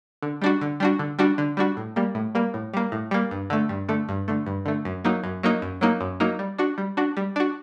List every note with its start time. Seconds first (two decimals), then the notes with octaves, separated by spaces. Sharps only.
0.22 D3
0.42 G3 D4 F#4
0.61 D3
0.80 G3 D4 F#4
0.99 D3
1.19 G3 D4 F#4
1.38 D3
1.57 G3 D4 F#4
1.77 A2
1.96 G3 A#3
2.15 A2
2.35 G3 A#3
2.54 A2
2.74 G3 A#3
2.92 A2
3.11 G3 A#3
3.31 G2
3.50 D3 A3
3.69 G2
3.89 D3 A3
4.09 G2
4.28 D3 A3
4.46 G2
4.66 D3 A3
4.85 F#2
5.04 F#3 A#3 D#4
5.24 F#2
5.43 F#3 A#3 D#4
5.62 F#2
5.81 F#3 A#3 D#4
6.01 F#2
6.20 F#3 A#3 D#4
6.39 G3
6.58 D4 F#4
6.78 G3
6.97 D4 F#4
7.17 G3
7.36 D4 F#4